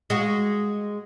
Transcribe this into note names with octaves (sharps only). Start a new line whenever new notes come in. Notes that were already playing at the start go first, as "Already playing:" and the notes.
G#3 F#4